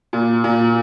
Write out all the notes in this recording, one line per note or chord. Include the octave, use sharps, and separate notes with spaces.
A#2
A#2